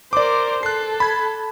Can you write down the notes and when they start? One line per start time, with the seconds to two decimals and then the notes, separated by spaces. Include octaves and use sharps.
0.13 A#4 C5 D5 D6
0.63 A4 F#6 C7
1.00 B5 G#6